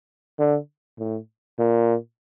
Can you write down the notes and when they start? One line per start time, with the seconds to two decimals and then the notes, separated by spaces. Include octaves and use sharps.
0.39 D3
0.99 A2
1.59 A#2